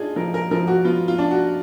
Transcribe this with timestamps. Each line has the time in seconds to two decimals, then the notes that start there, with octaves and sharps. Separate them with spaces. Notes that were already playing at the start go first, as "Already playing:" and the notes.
Already playing: D4 D#4 F4 G#4
0.16 F3 A#4
0.34 A#4
0.51 F3 A#4
0.67 F#4
0.84 B3 F4
1.08 F4
1.18 D4
1.31 F#4